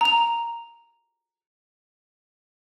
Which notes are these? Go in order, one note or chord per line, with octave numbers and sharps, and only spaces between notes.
A#5 F7